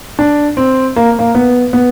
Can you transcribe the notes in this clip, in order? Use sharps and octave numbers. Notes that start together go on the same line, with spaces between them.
D4
C4
A#3
A#3
B3
B3